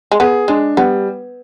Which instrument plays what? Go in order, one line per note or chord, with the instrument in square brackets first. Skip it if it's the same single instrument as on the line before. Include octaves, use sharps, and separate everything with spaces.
[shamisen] G#3
[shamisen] B3 [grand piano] G#4
[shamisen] G#3 [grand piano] D4
[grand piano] G3 [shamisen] B3